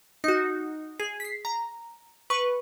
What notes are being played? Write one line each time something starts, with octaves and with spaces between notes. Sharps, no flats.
D#4 F#4
G#4
B6 C7
A#5
B4 C#6